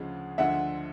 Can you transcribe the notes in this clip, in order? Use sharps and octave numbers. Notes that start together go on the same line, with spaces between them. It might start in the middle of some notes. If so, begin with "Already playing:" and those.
Already playing: D2 C#3 F3 G#3
D2 D3 F3 G#3 E5 F#5